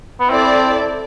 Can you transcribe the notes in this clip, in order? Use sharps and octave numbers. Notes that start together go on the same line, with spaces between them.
B3
C4 E4 A4 D5